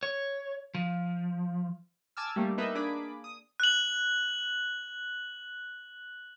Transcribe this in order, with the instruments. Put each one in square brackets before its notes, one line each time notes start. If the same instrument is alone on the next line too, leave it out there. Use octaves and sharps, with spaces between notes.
[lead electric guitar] C#5
F3
[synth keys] G#5 A5 D6 E6 F6
G3 A3 A#3 D4
A#3 B3 D#4 B4 D#5 E5
A#3 D4 G#4 B5 D6
D#6
[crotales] F#6 F#7